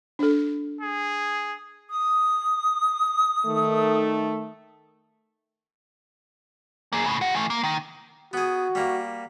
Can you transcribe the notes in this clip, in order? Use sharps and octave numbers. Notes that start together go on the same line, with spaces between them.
D4 A4
G#4
D#6
D#3 A3
A#3 G#4
A2 C#3
G4 F#5
E3 A3
A#3
D#3
B3 F#4 G#4
G3 A#3